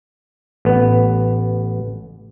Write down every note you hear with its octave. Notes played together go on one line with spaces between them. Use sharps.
A1 B3